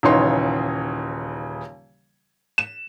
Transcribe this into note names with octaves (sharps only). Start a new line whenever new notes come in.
D#1 C#3 E3 D#4 C#5 C6
E7